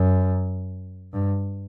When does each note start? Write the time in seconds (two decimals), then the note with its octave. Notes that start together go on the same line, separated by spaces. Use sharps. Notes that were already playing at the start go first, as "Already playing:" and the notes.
Already playing: F#2
1.13 G2